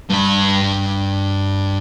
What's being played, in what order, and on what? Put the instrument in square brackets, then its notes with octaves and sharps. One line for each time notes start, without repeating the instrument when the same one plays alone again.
[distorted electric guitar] G2 B5